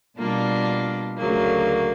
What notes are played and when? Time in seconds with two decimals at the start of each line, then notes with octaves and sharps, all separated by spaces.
0.18 B2 G3 A#3 D4 F4
1.17 D2 C#3 F#3 A#3